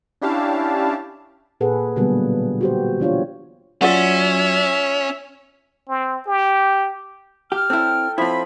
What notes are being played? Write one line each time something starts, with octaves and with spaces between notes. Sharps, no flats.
C#4 D4 E4 G4 F5 A5
A#2 G#4 A4 B4 F#5
B2 D3 F#3 G3 A#3 B3
F#4 G4 C5
E3 D4 F4 C#5
F#3 C#4 F4 D5 E5 F#5
C4
G4
G4 F6
C4 E4 A4 G5
F3 C4 E4 B5